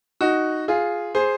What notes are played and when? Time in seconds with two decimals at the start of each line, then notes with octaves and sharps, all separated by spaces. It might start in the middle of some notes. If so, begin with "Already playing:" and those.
0.21 D#4 F#4
0.68 F4 G#4
1.15 G#4 C5